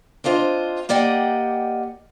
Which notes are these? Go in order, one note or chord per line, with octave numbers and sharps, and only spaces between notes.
C4 D4 F4 C5 D#5
A#3 G4 D5 D#5 F#5 G5